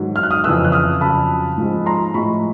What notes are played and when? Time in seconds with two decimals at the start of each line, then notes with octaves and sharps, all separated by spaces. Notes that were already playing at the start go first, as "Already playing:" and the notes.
Already playing: G#2 D#3 F#3
0.16 F6
0.23 F#6
0.31 D#6 F6
0.44 F2 C#3 E3 E6 F#6
0.64 F#6
0.72 D#6 F6
1.01 F2 C#3 F#3 A5 B5
1.58 G#2 F3 G#3
1.86 A#5 C6
2.14 A2 F3 G#3 B5 C#6